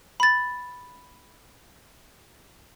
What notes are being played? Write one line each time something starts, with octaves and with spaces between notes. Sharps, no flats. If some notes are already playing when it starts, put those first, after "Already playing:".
B5 A6